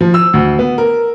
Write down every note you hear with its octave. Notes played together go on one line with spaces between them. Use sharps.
F3
E6
D2
B3
A#4